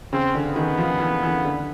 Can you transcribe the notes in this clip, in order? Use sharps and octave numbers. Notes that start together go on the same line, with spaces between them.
C#3 C4
D3
B3
D#3
F3
E3
E3
D3